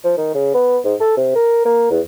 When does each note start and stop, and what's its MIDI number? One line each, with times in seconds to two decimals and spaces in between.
0.04 0.13 53
0.17 0.29 51
0.34 0.51 49
0.54 0.78 59
0.84 0.94 44
1.01 1.13 69
1.17 1.31 48
1.35 1.61 70
1.65 1.88 58
1.91 2.00 40